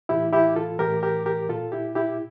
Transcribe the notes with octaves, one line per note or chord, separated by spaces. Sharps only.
A2 E3 E4 G4
E4 G4
F4 A4
A2 E3 G4 A#4
G4 A#4
G4 A#4
A#2 F4 A4
E4 G4
E4 G4